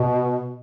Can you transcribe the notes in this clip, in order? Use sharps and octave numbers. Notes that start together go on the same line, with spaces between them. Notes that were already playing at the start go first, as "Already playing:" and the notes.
Already playing: B2